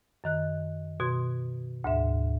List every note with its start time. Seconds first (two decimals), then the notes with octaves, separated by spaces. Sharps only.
0.24 F#2 D#3 F#6
1.00 B2 F#4 C6 G#6
1.84 D2 G#2 E5